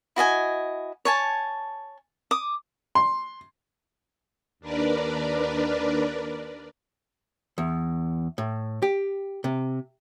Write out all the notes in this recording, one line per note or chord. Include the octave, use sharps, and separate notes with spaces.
E4 F#4 D#5 G#5
C#5 G#5 A5
D6 D#6
C6
D#2 D4 A#4 B4 D5
E2
A2
G4
C3